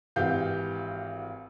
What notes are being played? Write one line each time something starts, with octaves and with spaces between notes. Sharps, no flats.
G#1 E3 F#4 G4 F5 G6